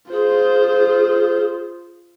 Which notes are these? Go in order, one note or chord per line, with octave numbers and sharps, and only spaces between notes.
F4 G#4 C5